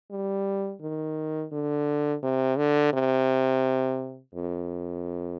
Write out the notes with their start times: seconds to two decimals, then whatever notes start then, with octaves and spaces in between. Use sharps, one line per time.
0.11 G3
0.81 D#3
1.52 D3
2.23 C3
2.58 D3
2.93 C3
4.35 F2